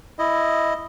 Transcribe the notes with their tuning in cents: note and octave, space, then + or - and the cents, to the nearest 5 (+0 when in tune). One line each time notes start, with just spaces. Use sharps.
E4 +0 D#5 +0